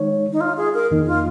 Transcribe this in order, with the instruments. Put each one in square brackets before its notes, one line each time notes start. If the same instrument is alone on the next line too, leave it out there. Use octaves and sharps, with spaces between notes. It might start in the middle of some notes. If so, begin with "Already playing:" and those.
Already playing: [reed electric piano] D#3 G#3 D#4 C#5
[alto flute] D#4
F4
G#4
A#4
[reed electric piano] F2 D#3 A#3 D#4
[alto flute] F4